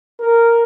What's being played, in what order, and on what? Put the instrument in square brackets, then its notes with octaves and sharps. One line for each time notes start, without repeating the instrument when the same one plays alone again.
[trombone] A#4